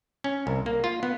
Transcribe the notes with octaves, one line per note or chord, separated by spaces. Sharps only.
C#4
C2
A#3
F4
B3